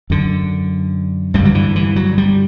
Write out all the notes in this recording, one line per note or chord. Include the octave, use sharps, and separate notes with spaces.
F#2 D3
G2 D3 G3
F#3
E3
E3
F#3
G3